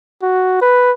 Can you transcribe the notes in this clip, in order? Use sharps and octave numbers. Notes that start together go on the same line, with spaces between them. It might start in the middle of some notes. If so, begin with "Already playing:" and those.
F#4
B4